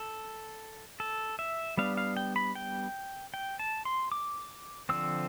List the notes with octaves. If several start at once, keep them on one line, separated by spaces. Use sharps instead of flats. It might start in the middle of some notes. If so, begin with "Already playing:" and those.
Already playing: A4
A4
E5
G3 B3 D4 F5
F5
G5
B5
G5
G5
A5
C6
D6
D3 F3 C4 E6